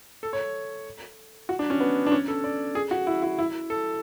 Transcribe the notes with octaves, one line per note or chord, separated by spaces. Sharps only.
A4
C#5
F#4
D4
C#4
B3
D4
C#4
A4
D5
G#4
F#4
E4
E4
E4
A4